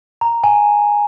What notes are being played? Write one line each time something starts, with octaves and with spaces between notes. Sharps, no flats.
A#5
G#5